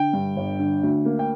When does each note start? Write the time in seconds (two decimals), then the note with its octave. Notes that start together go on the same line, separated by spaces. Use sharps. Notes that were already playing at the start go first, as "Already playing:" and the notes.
Already playing: D3 G5
0.13 G2
0.36 G1
0.59 D3
0.83 D2
1.05 A#3
1.19 G5